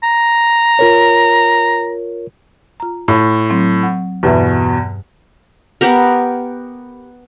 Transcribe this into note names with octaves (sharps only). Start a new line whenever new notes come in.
A#5
F4 A#4 C#5
F4 A#5
A2
F#3 C4
F#5
E2 G2 B2 E5
B3 G4 A#4